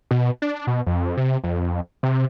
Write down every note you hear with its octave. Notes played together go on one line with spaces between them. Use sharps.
B2
D4
B2
F2
C3
F2
C3